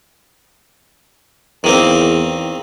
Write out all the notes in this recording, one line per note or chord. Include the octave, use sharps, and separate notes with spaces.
E2 D#3 A#3 C4